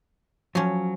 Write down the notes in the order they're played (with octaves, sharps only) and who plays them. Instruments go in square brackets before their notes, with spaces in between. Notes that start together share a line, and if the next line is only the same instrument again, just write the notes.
[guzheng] F3 C#4 [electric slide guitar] F#3